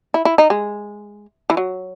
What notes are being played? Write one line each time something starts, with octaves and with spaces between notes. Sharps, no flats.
E4
E4
D#4
G#3
E3
F#3